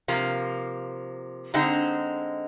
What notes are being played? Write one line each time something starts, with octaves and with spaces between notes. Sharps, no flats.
C3 F3 A#3
D3 G#3 C4 D#4